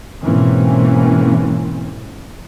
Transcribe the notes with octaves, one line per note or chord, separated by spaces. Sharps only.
G#2 B2 E3 A#3 C4 C#4